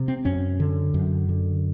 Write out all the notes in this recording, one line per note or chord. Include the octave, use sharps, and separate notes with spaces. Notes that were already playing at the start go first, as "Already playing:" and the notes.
Already playing: C3
C4
F#2 C#4
D3
F#2
D3